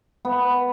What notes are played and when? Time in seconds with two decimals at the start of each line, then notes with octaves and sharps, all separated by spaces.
0.25 B3